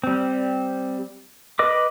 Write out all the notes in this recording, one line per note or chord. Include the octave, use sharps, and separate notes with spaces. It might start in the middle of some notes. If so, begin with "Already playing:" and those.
G3 C4
B4 D#5 D6